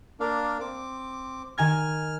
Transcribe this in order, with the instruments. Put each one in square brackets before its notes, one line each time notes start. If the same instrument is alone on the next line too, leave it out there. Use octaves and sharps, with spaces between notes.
[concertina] A#3 D4 F5
C4 D6
[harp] D#3 G#5 G#6 [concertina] F6